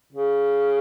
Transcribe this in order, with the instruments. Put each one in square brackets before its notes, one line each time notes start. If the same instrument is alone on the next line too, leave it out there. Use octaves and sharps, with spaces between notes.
[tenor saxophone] C#3